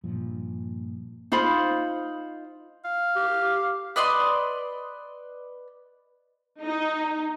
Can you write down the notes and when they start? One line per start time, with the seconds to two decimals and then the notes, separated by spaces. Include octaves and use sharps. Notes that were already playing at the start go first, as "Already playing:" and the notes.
0.04 G2 A#2 F3
1.32 D#4 F4 C5 B5
2.85 F5
3.16 G4
3.96 B4 D5 D#5 C6
6.61 D#4